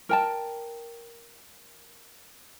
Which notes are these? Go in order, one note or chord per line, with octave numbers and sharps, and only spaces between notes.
A#4 G5 A5